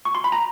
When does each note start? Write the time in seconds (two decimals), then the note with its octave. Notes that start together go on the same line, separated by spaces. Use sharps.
0.05 C#6
0.15 C6
0.24 B5
0.32 A#5